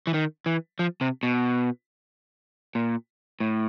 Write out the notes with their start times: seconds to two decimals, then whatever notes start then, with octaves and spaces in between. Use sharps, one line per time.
0.07 E3
0.14 D#3
0.46 E3
0.79 F3
1.01 C3
1.23 B2
2.75 A#2
3.40 A2